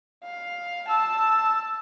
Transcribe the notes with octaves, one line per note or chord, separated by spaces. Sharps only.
F5
A5 E6